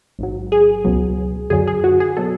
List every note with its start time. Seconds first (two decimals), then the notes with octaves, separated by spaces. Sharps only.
0.19 A1 G#2 F#3
0.52 G#4
0.84 C#2 B2 F#3
1.50 F#2 D3 F#3 G#4
1.67 G#4
1.84 F#4
2.00 G#4
2.17 B2 F#3 A4